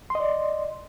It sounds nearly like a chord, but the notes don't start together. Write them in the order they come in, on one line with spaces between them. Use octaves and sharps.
C6 D#5 D5